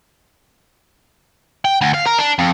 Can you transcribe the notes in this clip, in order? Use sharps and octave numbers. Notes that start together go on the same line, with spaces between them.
G5
D2
F5
A#4
D4
F2